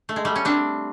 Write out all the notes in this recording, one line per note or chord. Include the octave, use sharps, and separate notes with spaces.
A3
G#3
G3 A3
C#4
C4 D4